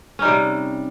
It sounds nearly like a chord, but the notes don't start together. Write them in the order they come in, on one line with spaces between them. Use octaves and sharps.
C#4 D#4 G3 C3